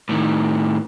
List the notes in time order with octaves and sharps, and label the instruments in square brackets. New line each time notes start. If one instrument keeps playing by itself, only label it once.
[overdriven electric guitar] A2 D#3